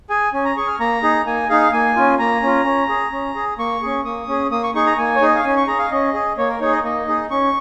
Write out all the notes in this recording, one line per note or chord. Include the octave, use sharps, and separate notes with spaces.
G#4 G#5
C#4 G#5
A#5
G#4 C#6
F6
A#3 A#5
D#4 G#4
A#3 G#5
D#4 G#4 F5
A#3 G#5
C#4 F4
A#3 A#5
C#4 F4
C#4
G#4
C#4
G#4
A#3 C#6
C#4 G#4
A#3 D#6
C#4 G#4
A#3 D#6
C#6
D#4 G#4 C#6
A#5
A#3 G#5
C#5
D#4 G#4 D#5
F5
C#4 G#5
C#6
G#4 A#5
F5
C#4 D#5
G#4
A#3 C#5
A#4
D#4 G#4 C#5
D#5
A#3 D#5
D#4 G#4
C#4 C#6